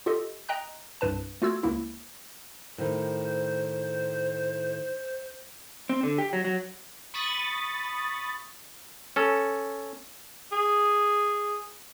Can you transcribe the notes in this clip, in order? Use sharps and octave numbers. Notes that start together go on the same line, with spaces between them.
F4 G4 A4 D#5
D#5 G5 A#5 F#6
C2 G2 B4 A5
A3 F4 F#4 E6 G#6
C#2 A#3 E4
A2 D#3 C5
C4
D3
G4
F#3
F#3
B5 C#6 D#6 A6
C#4 A4
G#4